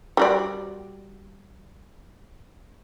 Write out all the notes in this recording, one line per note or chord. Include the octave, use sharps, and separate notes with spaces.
G3 F#4 D5